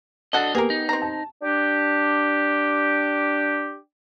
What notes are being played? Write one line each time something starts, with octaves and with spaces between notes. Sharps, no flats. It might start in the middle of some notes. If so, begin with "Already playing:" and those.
D4 F#4 A4 D#5 F#5
A#3 B3 G4 G#4 A#4
D#4
C4 A#5
A5
D4 G4